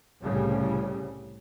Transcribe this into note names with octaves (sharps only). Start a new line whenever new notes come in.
C2 A2 C#3 G3